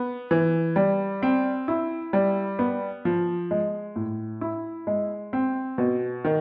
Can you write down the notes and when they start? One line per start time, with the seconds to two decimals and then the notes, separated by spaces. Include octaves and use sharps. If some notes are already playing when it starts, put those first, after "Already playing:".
Already playing: B3
0.31 E3
0.76 G3
1.23 C4
1.68 E4
2.13 G3
2.59 B3
3.05 F3
3.51 G#3
3.96 A2
4.41 E4
4.87 G#3
5.33 C4
5.78 B2
6.25 D#3